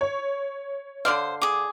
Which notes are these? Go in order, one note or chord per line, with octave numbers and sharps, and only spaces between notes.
C#5
D3 C5 D5 F5
G#4 D6